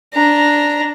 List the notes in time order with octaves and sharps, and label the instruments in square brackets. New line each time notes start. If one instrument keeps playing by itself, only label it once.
[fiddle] D4 A#5